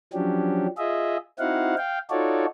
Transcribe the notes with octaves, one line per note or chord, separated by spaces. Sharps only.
F3 F#3 C#4 D4 G4
F4 G#4 D#5 E5
C4 D#4 E4 F#4 F5 F#5
F5 G5
D#4 F4 F#4 A4 C#5 D5